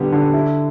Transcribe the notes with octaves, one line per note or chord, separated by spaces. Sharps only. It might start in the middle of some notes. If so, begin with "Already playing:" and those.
Already playing: D3 G3 B3
D3
E4